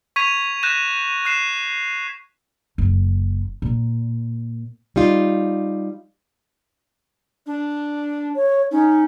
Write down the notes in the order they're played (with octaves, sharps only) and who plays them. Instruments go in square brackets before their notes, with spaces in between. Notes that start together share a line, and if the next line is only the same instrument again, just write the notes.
[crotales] C#6 G#6 B6 D#7 F7
F#6 G6 A#6 B6 D#7 E7
F#6 C7 E7
[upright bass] F#1
A#2
[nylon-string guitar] G3 D#4 F4
[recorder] D4
[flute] C#5
[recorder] C#4 [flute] D#4